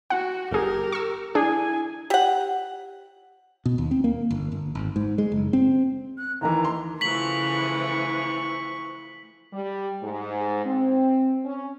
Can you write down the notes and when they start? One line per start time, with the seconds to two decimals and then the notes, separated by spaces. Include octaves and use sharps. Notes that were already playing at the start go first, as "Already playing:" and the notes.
0.10 F#4 F#5
0.51 G1 G4 G#4 A#4
0.92 C#6 E6
1.35 D4 E4 G#4 G#5
2.10 G4 F#5
3.66 B2
3.78 D#2
3.91 C4
4.04 A#3
4.31 G1
4.52 G1
4.75 G#1
4.96 G#2
5.18 G#3
5.32 F#1
5.53 C4
6.18 F#6
6.41 D#2 D#3 E3 A#5
6.65 C6
7.01 C#3 E3 F3 A3 C#6 B6 F#7
9.53 G3
10.03 G#2
10.66 C4
11.45 C#4